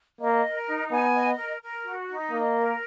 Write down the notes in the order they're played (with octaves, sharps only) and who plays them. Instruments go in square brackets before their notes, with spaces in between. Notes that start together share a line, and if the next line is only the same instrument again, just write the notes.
[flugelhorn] A#3 [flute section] D#5
[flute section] A#4
D#4
[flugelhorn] B3 [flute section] G#5
[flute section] D#5
A#4
A#4
F#4
D#4
[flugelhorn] A#3 [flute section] D#5
[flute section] A#4